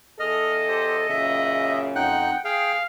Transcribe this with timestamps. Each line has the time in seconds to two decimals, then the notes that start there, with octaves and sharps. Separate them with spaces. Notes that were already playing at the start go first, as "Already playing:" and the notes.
0.20 E2 G#4 A4 D#5 F6
0.68 G4 C5
1.10 F#2 A#2 C#3 E5
1.95 F2 D#4 F#5 G5 F#6
2.45 G#4 F5 G5